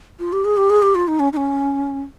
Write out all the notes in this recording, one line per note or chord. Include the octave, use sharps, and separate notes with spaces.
F4
G4
G#4
G4
G#4
G4
F4
D#4
C#4
D#4
C#4